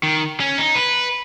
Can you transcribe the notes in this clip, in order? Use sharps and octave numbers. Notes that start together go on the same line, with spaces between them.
D#3
C#4
D#4
B4